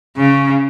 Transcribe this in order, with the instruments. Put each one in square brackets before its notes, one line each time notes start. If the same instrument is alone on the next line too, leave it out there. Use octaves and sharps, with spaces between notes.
[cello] C#3